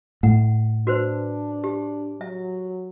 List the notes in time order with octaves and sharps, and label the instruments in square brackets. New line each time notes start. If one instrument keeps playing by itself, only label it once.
[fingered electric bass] A2 [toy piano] F#5
[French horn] D4 [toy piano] F#4 B4 C5
[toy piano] G4
[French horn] F#3 [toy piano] E5